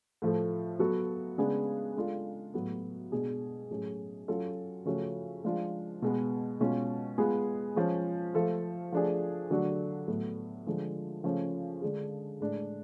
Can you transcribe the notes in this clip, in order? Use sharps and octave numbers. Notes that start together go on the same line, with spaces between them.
A2 F3 A3
F#3 B3 F#4 A4
C#3 G#3 B3 D4 G#4
G#3 D4 F4 A4
A2 F#3 B3
B2 G#3 D4 G#4
A2 F#3 C#4 G#4
F#3 C#4 F4 A4
C#3 F3 A3 C#4 F#4
F3 G#3 D4 F4
B2 G#3 B3
B2 G#3 C#4 F4
G#3 B3 F4 G#4
F3 G#3 C#4
F3 A3 F4 A4
F3 A3 D4 G#4
D3 F#3 A3 D4 F#4
A2 F#3 B3
D3 F3 G#3
C#3 F3 A3 C#4
D3 G#3 D4 G#4
A2 G#3 D4